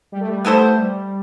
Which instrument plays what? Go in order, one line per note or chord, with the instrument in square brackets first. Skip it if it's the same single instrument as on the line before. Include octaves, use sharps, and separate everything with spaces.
[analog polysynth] G3
A3
G3
[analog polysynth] A3 [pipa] B3 E4 A4 C5
[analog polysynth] G3